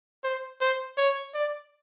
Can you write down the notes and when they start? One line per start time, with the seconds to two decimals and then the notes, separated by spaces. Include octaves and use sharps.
0.24 C5
0.61 C5
0.98 C#5
1.34 D5